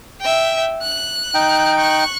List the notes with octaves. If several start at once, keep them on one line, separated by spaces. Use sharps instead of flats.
E5 G5
F#6
D#4 G5
C#6 F#6